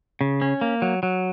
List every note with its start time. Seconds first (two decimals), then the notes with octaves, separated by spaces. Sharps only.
0.21 C#3
0.41 C#4
0.61 A#3
0.82 F#3
1.03 F#3